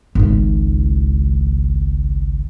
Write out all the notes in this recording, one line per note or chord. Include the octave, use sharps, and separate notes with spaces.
G#1 C#2